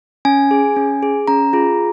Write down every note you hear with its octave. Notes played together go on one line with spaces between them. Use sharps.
C#4 G#5
G#4
C#4
G#4
C#4 A#5
F4 G#4